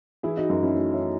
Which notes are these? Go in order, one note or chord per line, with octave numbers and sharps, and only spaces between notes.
E3 E4 G#4
D#4 F#4
F#2 D#4
C#4 E4
A3 D#4 F#4
C#5 E5